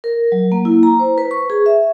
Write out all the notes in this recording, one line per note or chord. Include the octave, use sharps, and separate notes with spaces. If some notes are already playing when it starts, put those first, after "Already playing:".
A#4
F#3
A#3
E4
A#5
C5
B4
C#6
G#4
E5